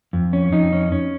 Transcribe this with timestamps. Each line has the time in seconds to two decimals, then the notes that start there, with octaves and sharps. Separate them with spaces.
0.13 F2
0.33 C#4
0.52 F2 D#4
0.72 C#4
0.92 C#4